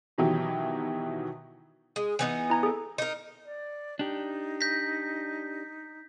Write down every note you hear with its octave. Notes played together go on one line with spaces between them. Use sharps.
B2 D#3 E3 F#3 G4
G#3
E3 B3 D#4
E4 A#5 G#6
G#4 A4
D#4 A#4
D5
D4 D#4 G4
G6 A#6 B6